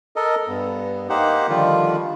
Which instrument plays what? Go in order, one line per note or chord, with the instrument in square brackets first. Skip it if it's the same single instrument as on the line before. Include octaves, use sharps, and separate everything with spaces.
[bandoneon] A4 A#4 D#5
G2 B3
A#3 D#4 G4 C5 F#5
D3 D#3 F3 G3 F4